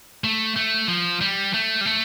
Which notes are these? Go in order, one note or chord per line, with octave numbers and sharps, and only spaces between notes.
A3
A3
F3
G3
A3
G3
A3